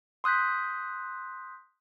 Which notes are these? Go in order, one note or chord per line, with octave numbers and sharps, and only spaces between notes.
C6 D#6 F#6 G6 B6